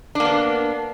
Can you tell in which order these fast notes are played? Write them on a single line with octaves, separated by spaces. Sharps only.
D4 A#3 B3